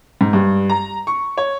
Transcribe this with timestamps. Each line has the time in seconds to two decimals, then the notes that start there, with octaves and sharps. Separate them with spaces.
0.21 G#2
0.33 G2
0.70 A#5
1.07 C#6
1.38 C#5